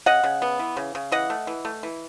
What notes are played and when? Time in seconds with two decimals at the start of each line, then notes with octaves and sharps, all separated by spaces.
0.06 C#3 D#5 F#5
0.24 C#3
0.42 B3
0.59 E3
0.77 C#3
0.95 C#3
1.12 E3 D#5 F#5
1.30 A3
1.47 E3
1.65 A3
1.83 E3